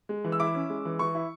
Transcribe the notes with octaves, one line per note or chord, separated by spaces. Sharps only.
G#3
E3
E6
E4 D6
C#4
G#3
E3
E3 C#6
E4